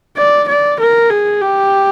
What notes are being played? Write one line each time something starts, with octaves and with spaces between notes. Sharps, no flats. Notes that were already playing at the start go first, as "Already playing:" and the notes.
D5
D5
A#4
G#4
G4